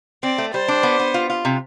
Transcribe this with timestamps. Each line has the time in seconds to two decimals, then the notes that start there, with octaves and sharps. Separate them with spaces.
0.23 C4 D5
0.38 A3
0.53 G3 C5
0.68 D4
0.83 B3
0.99 B3
1.14 F4
1.30 F4
1.45 C3